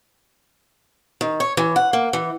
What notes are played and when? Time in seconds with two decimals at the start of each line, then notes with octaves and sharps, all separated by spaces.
1.21 D#3
1.40 C#5
1.57 E3
1.76 F#5
1.93 A#3
2.13 E3